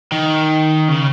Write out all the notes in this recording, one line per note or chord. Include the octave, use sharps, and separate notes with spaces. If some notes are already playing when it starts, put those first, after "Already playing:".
D#3
C#3